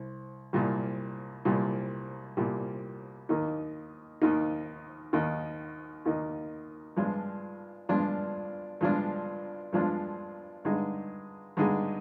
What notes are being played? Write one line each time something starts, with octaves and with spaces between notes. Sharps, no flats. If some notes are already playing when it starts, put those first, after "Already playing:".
Already playing: C2
C2 A#2 G3
C2 A#2 G3
C2 A#2 G3
D#2 D#3 A#3 D#4
D#2 D#3 A#3 D#4
D#2 D#3 A#3 D#4
D#2 D#3 A#3 D#4
G2 F3 G#3 D4 F4
G2 F3 G#3 D4 F4
G2 F3 G#3 D4 F4
G2 F3 G#3 D4 F4
G2 D3 G#3 D#4 G#4
G2 D3 G#3 D#4 G#4